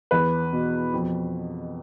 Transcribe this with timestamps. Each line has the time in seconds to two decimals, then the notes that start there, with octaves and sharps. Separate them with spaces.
0.11 E2 B4
0.53 B2
0.93 F2